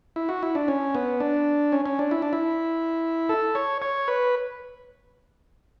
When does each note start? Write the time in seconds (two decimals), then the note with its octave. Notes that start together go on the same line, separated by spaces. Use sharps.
0.16 E4
0.29 F#4
0.43 E4
0.55 D4
0.68 C#4
0.95 B3
1.20 D4
1.72 C#4
1.86 C#4
1.99 D4
2.11 E4
2.22 D4
2.33 E4
3.29 A4
3.55 C#5
3.82 C#5
4.08 B4